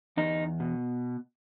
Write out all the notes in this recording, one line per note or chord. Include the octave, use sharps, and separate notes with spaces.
E2 D#4
B2